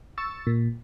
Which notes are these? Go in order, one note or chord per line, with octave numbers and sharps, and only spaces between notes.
C#6 E6 A6
A#2